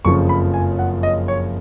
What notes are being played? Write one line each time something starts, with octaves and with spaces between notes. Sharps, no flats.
F#1 F2 C#3 F3 C#6
B5
G#5
F#5
D#5
C#5